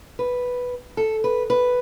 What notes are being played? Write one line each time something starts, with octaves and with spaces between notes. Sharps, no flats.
B4
A4
B4
B4